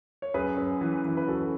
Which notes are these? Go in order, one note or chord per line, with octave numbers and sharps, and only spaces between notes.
C#5
F#2 G#4 B4
F#2
E3
E3
B4
F#2 F#4 A4